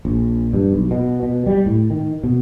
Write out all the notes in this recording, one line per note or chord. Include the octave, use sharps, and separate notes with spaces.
A#1
G2
B1
B2
B2
G3
A2
D#3
B2